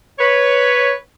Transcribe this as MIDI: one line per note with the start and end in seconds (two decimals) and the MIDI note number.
0.19 0.93 71
0.19 0.93 73